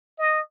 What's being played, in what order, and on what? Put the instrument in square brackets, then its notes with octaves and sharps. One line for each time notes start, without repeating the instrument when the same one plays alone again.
[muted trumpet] D#5